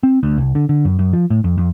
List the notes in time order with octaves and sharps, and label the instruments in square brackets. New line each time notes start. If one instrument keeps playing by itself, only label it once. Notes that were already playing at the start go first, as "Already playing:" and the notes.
[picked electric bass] C4
D2
C2
D3
D3
F#2
F#2
F3
A2
F2
F2